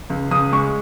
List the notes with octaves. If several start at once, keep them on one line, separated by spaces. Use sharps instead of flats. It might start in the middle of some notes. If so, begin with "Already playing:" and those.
C#2
C#2 D#6
G#3 C#6